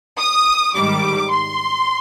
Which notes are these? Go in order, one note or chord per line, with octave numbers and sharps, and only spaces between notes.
D#6
G#2 D#3 G3 D6
C6